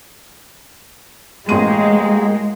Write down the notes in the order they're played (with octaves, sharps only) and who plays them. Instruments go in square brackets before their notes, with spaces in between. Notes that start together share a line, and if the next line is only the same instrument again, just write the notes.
[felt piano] A1 C6 D#7 [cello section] G#3 [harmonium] A#3 G#4